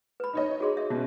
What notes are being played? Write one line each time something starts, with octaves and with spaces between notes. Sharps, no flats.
B4 B5
D#4 C#5 D#5
F#4 G#4 C6
E5
B2 C#4 F#4